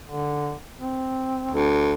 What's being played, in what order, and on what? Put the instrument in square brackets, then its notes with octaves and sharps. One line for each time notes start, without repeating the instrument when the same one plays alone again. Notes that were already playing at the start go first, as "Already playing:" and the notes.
[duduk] D3
C4
[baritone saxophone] D2